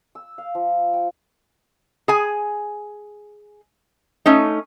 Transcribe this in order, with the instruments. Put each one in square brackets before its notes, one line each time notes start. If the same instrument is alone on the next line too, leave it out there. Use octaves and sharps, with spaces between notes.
[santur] E6
F5
F3
G5
[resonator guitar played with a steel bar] G#4 G#5
A3 C#4 D#4